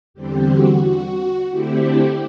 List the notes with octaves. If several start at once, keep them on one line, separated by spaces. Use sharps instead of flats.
E2 D3 G3 C4 G4
F#4
F#4
D3 A3 C4 E4 G4